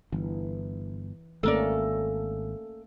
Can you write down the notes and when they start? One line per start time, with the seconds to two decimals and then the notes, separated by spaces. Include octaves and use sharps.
0.12 G1 E3
1.43 G#1 A3 A#3 C#4 A4 A#4 D5